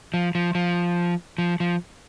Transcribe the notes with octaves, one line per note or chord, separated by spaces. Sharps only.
F3
F3
F3
F3
F3